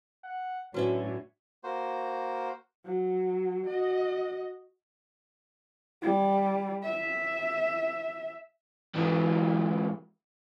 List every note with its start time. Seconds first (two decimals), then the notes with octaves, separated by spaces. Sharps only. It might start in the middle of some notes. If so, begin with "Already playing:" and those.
0.24 F#5
0.74 A2 D3 F#3 C#4 F#4 B4 C#5 E5
1.64 A#3 F#4 C5
2.85 F#3
3.66 F#4 D#5
6.02 G3
6.84 E5
8.95 G#2 E3